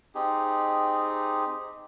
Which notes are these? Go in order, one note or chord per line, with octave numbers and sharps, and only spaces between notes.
C4 D#4 G4 G#4